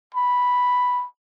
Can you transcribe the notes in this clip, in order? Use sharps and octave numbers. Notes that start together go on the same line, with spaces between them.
B5